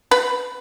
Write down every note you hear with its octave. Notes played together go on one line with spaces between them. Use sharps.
B4